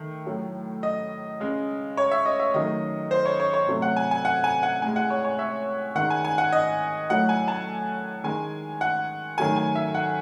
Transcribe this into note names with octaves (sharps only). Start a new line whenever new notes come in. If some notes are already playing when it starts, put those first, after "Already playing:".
Already playing: D#3 A3
A2 F#3 A3
D#5
C#3 G#3
C#5
E5
D#5
E5
D#3 F#3 A3 D#5
C5
C#5
C#5
C#5
C3 F#3 A3
F#5
G#5
G#5
F#5
G#5
F#5
A2 G#3 G#5
F#5
C#5
C#5
E5
D#3 G#3 F#5
G#5
G#5
F#5
D#5
A2 F#3 A3 F#5
G#5
A5
D#3 G#3 G#5
F#5
D#3 F#3 A3 G#5
G#5
E5
F#5